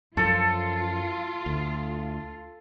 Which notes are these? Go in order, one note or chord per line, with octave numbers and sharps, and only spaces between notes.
F#2 F3 F4 A4
D2